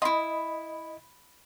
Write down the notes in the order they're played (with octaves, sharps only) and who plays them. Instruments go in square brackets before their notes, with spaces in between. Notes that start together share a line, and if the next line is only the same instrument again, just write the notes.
[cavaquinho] E4 F4 [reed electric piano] D#5 B5